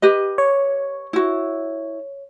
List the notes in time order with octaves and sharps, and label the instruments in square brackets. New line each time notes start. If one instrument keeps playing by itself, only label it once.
[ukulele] G4 B4 D#5
[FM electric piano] C#5
[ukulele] E4 F#4